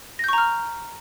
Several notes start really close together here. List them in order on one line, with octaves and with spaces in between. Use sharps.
A#6 G6 C#6 A#5 F6